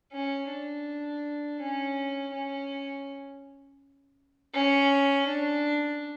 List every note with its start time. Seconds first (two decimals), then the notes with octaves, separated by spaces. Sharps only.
0.12 C#4
0.49 D4
1.60 C#4
2.33 C#4
4.54 C#4
5.28 D4